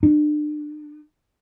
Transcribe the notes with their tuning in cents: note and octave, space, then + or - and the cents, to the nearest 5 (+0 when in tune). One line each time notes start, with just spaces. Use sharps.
D4 +35